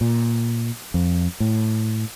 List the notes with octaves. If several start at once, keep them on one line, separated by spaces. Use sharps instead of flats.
A#2
F2
A2